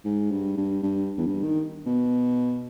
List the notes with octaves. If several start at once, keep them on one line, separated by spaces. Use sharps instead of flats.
G#2
G2
G2
G2
E2
G2
D#3
B2